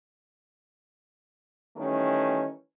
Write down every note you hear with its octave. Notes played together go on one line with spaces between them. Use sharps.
D#3 E3 G3 A3 C#4